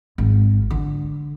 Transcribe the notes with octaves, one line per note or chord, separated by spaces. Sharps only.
G#1
D3